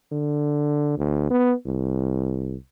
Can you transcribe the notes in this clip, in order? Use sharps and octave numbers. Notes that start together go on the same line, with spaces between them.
D3
D2
B3
C2